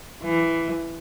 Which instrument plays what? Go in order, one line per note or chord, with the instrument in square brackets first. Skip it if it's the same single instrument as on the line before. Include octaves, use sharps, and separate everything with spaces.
[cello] E3